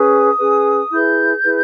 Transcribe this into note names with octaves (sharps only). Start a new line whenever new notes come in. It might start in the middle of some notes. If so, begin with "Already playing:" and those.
Already playing: C#4 G#4 B4 D#6
C#4 G#4 B4
E4 G#4 B4 G6
E4 G#4 B4